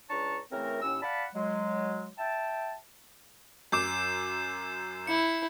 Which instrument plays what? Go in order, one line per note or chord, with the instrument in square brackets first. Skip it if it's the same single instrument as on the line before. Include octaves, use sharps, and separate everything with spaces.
[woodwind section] C#2 D4 C#5 A5 A#5 C#6
C#3 E3 A3 C4 A#4
D#2 A2 C#4 E6
D5 F5 F#5 A5 B5
F#3 G#3
E5 G5 A5
[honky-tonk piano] F#2 D6 [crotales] G6 C7 E7
[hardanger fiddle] E4 [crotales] C#7